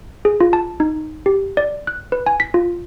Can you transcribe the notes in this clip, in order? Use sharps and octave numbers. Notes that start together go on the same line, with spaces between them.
G#4
F4
A5
D#4
G4
D5
F#6
B4
G#5
B6
F4